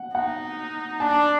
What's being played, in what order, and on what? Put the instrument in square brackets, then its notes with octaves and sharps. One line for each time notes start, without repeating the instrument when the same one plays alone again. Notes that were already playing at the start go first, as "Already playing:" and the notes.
Already playing: [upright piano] F#5
[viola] D#4 [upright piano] F#5
[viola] D4 [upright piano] A5